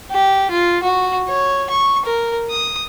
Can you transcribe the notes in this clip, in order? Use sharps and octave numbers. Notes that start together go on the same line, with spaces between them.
G4
F4
F#4
C#5
C#6
A#4
D#6